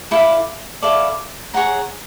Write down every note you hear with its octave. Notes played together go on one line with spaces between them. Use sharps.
E4 A4 D5 F5
E4 A4 D5 F5
G#4 C#5 F#5 A#5